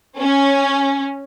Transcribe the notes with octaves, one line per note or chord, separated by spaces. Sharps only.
C#4